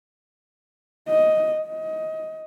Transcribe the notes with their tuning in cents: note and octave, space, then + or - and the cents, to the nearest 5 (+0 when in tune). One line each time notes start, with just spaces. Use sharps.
D#5 +10
D#5 +20